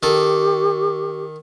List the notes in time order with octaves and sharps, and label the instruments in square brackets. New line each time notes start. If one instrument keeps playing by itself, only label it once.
[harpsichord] D#3 A4 [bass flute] G4